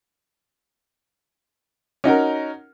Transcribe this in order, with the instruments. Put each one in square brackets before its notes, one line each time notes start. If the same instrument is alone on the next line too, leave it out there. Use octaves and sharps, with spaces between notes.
[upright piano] C#4 D#4 F#4 A#4